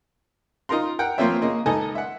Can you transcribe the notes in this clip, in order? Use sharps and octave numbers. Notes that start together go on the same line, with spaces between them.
D#4 F4 A#4 A#5 C6
A#4 F#5 G5
F3 A#3 C4 F4 C#5 E5
C#3 A#3 D#5
C#2 D#4 A4 D#5 G#5
E5 F#5